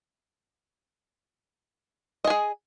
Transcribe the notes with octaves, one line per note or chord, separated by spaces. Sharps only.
G#4 D#5 G#5